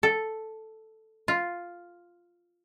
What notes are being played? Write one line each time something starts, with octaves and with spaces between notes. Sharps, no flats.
A4
F4